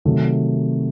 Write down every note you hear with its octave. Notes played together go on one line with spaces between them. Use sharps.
C3 D#3 F#3 A3